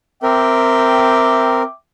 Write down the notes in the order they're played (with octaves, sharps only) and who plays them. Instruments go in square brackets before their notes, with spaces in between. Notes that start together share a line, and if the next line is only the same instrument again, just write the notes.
[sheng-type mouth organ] C4 A#4 [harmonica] E5 G5 D6